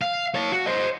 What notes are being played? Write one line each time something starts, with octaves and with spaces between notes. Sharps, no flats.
F5
C#5 A5
F#4
C5 D#5